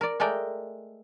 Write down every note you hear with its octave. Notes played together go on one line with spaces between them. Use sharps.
A#4 D5
G#3 A3 A#4 D5 G5